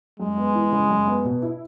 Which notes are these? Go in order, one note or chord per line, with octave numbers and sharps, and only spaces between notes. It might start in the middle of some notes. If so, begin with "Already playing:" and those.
F#2 G#3
B3
E3
C#3
F#2
B3
B2
E4